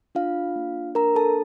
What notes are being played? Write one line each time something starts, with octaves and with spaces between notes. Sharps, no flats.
D4 F4 F5
A#3
D4 A#4 A#5
A4 A5